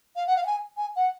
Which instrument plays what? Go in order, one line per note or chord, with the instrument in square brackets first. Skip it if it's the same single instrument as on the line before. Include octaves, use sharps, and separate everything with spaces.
[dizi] F5
F#5
F5
F#5
G#5
G#5
F#5